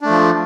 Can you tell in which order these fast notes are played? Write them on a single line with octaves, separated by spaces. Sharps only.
D4 A3 F3